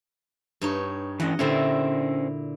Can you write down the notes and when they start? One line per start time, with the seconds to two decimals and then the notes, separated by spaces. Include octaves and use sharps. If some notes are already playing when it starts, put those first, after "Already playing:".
0.61 G2 D#4 C#5
1.20 E3 C#4 D#5 F#5
1.39 A#2 D3 C#4 E4 C5